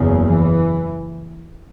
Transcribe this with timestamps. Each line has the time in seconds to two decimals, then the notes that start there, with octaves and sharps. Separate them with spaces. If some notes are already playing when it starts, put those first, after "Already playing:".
Already playing: F#1 E2 C#3
0.24 E3